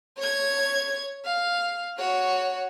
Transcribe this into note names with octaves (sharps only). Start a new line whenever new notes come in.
C#5 G#6
F5
F#4 C#5